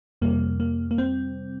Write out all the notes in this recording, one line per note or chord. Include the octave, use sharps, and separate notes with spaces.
F2 C3 G3 A#3
A#3
A#3
C4